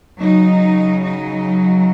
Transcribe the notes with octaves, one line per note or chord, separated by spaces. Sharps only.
C#3 F#3 D#4
D#4